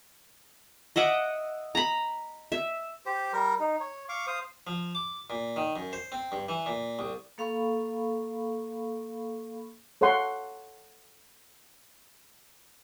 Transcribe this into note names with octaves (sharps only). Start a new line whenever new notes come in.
D#5 E5 F#5 D6
A#5 B5
E5
G4 C5
G3 A#4
D#4
C#5
F5 C#6 D6
C5 F5 D#6
F3
D6
A#2
D#3
F#2
C5
C4
G2
E3
A#2
C2
A#3 A4 F5 B5 C#6
A4 C#5 F5 F#5 C6